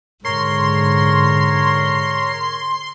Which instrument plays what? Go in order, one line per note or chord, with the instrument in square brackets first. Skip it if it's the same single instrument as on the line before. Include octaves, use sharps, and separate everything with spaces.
[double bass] G#2 D3 [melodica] A#4 C#5 [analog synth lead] C6